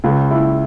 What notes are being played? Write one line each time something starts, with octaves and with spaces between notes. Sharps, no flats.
C#2
E4